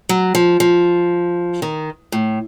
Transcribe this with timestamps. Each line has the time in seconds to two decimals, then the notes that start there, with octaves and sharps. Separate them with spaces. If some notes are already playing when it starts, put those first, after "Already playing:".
0.09 F#3
0.35 F3
0.60 F3
1.62 D#3
2.12 A2